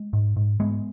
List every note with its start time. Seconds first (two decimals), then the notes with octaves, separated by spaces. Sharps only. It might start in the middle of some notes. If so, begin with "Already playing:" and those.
Already playing: G#3
0.13 G#2
0.36 G#2
0.60 G#2 G#3 B3